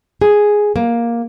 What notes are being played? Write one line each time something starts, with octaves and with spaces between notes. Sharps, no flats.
G#4
A#3